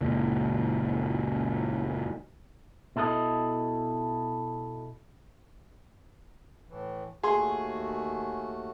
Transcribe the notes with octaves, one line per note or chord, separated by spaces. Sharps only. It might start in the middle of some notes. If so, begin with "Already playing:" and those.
F#1 C#2 A#2
B2 E4 A4 A#4 D#5
A2 E3
D#2 A3 F#4 G#4 C6